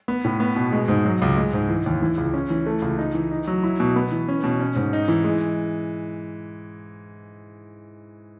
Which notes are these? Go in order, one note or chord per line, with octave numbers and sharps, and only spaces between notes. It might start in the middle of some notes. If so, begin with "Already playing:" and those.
B3
A2
B3
B2
G#3
G#2
F#3
C#2
G#3
G#2
E3
D#2
E3
C#2
C#4
E3
A3
C#2
D#4
E3
D#4
F#3
E4
B2
B3
E3
C#4
B2
C#4
G#2
D#4
E3
G#3